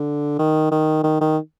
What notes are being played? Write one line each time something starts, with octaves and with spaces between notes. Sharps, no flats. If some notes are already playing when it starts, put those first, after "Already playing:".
Already playing: D3
D#3
D#3
D#3
D#3